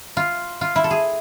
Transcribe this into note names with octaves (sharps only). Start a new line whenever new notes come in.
F4
F4
E4
A4
G#4